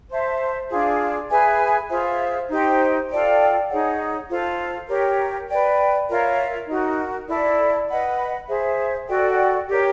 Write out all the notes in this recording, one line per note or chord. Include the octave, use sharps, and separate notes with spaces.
C5 E5 A5
D4 F4 G#4
G#4 B4 E5 G#5
F4 G#4 C5 E5
D#4 G4 C5
F4 A4 D5 G5
D#4 G#4 C#5 F#5
F4 A4 C5
G4 A#4 C#5
B4 D5 G5
F4 A#4 C#5 E5
D#4 F#4 A#4
E4 A4 D5
B4 D#5 F#5 B5
G#4 C5 E5
F#4 A4 D5 G5
G4 A#4 C#5